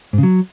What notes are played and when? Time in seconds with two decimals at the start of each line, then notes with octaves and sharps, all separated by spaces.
0.13 G#2
0.18 C#3
0.23 F#3